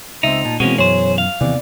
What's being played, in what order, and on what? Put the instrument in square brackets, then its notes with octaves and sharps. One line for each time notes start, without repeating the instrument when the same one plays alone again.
[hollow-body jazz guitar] C#2 C4 [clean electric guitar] D#4 [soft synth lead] E5
[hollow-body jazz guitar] A#2 [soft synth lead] A5
[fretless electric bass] B2 E3 [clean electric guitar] G#3 A#3 C#4 [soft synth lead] C4 [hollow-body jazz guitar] F#4
[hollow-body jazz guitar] F#2 [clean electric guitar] G#4 C5 [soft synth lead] C#5
[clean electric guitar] F5 [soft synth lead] F6
[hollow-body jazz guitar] D#2 E3 [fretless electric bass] C3 B3 C4 [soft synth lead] D5